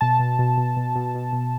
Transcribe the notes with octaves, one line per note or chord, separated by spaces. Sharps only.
B2 A5
B2
B2
B2
B2
B2
B2
B2